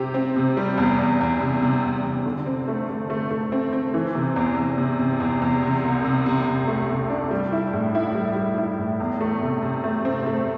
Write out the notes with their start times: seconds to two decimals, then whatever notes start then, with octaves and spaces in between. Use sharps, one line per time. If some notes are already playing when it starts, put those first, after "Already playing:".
Already playing: C3 C4 G4
0.14 C4
0.36 C3
0.57 G3
0.78 E2
0.99 E2
1.21 E2
1.40 C3
1.62 C3
1.84 E2
2.04 C3
2.26 D3
2.46 C4
2.68 A3
2.89 A3
3.10 A3
3.30 A3
3.52 C4
3.73 C4
3.94 E3
4.15 C3
4.36 E2
4.58 E2
4.78 C3
4.99 C3
5.20 E2
5.42 E2
5.63 C3
5.84 C2
6.04 C3
6.26 C3
6.47 C3
6.67 A3
6.89 C3
7.10 D4
7.31 G3
7.52 E4
7.73 A2
7.95 E4
8.15 G3
8.36 G3
8.58 E4
8.79 A2
9.00 E2
9.21 A3
9.42 C3
9.62 C3
9.84 A3
10.05 C4
10.26 A3